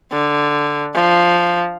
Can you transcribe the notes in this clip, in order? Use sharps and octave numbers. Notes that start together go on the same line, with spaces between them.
D3
F3